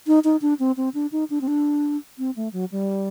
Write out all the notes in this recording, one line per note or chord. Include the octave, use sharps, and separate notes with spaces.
D#4
D#4
D4
C4
C4
D4
D#4
D4
C4
D4
C4
A3
F#3
G3